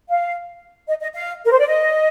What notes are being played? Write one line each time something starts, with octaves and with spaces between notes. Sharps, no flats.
F5
D#5
D#5
F5
A#4
C5
D5
D#5